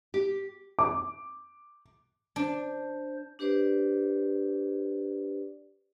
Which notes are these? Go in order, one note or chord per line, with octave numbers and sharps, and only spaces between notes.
G4
D6
D4 C5
D4 G4 B4 C5 D5